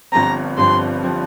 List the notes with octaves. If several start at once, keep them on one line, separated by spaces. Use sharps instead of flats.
G1 G2 F3 C4 A#5
G1 G2 F3 C4 C6
F3 C4